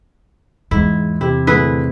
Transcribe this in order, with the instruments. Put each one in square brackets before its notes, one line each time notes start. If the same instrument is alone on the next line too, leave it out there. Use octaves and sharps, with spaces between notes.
[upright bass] E2 [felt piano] G#2 [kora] E4
[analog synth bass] C3 [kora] E4 [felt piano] G4
[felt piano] A2 D3 [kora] E4 G#4 B4